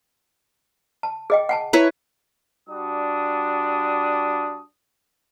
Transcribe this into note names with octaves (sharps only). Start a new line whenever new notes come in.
A5
G#4 D#5 G5
F#5 G#5 A5
E4 B4 C#5 A#5
G3 D4 F#4 D#6